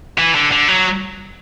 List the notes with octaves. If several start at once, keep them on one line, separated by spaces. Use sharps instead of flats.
E3
D3
D3
F#3